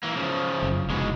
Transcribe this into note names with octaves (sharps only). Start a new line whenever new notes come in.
E3 A#3
C#3 F3
F#1
F1 G#2 B2 G#3